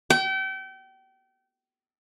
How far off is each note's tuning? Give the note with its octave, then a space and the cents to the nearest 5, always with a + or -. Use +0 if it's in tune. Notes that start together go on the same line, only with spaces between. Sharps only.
G5 -35